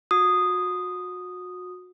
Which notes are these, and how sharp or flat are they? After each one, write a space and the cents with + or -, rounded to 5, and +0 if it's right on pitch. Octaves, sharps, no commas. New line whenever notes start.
F#4 -30 D#6 -5